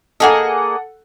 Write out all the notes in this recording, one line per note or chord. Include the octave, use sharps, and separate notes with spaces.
A#3 G#4 A4 D#5 F#5